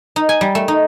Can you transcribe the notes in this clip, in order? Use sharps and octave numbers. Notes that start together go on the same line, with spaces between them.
D#4
G#5
G3
A3
D#4